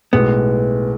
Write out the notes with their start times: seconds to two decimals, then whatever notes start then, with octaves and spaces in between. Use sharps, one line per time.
0.13 B1 A2 G#3 B3